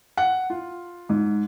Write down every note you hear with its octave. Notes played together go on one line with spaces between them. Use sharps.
F#5
F4
G#2